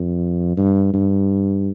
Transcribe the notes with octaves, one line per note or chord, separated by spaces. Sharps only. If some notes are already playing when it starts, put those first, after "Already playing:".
Already playing: F2
G2
G2